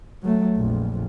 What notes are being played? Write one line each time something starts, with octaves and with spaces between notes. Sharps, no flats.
F#3 A3
A#1 F2